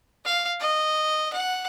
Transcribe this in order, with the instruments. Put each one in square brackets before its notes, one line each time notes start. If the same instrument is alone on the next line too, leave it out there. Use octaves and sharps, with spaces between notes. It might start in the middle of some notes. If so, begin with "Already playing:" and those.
[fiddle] F5
D#5
F#5